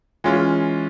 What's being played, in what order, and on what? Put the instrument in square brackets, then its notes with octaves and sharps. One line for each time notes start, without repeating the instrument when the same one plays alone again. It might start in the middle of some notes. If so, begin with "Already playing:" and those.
[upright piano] E3 G#3 C#4 F4